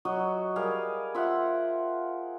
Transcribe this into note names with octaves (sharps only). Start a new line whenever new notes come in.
F#3 F#4 D#5
G3 G#4 A#4 F5
F4 C5 E5 F#5